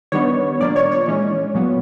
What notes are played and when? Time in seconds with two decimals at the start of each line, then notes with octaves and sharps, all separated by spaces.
0.12 D#3 G3 B3 D4 C#5
0.60 A#2 F3 A#3 D4 D5
0.76 C#5
0.92 C#5
1.07 E3 G#3 C#4
1.55 A#2 F#3 B3